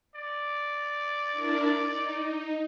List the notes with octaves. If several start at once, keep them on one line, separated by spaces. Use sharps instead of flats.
D5
D4 E4 A#4
D#4